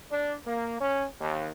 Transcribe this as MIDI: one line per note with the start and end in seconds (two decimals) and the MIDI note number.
0.11 0.35 62
0.45 0.77 58
0.79 1.04 61
1.19 1.49 39